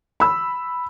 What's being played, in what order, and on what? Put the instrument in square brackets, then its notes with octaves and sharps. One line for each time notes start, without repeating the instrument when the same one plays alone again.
[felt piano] B5 E6